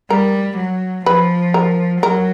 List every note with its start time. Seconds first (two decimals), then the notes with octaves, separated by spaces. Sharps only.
0.10 G3 A#4
0.59 F#3
1.06 F3 B4
1.54 A#4
2.03 F#3 A#4